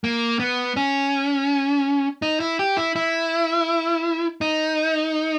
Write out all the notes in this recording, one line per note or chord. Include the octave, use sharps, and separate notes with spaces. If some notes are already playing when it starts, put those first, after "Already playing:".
A#3
B3
C#4
D#4
E4
G4
E4
E4
D#4